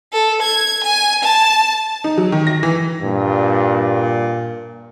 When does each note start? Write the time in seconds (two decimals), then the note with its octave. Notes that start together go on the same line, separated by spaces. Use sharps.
0.13 A4
0.42 G#6
0.84 G#5
1.23 A5
2.04 D#4
2.18 F#3
2.32 D#3
2.47 A#6
2.63 E3
3.02 G2 A#2